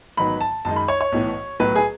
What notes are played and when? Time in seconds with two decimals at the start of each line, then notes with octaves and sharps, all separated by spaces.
0.17 A1 G#2 D#3 F#3 B3 B5
0.41 A5
0.65 F#2 D#3 G#3 D#4 A5
0.76 B5
0.88 C#5
1.01 C#5
1.12 B1 A2 E3
1.60 B1 A2 F#3 B4
1.76 G#4